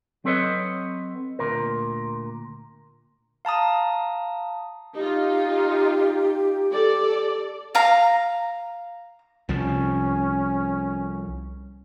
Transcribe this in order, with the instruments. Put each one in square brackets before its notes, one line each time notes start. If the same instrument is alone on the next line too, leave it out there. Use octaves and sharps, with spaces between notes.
[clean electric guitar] F#3 C4 A4 B4 C#5 D#5
D2 A#2 A#4
[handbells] F5 A5 A#5 D#6
[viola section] D#4 F4 [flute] G4
[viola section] A4 D5
[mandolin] F5 A#5
[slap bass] C2 F3 [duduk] C#4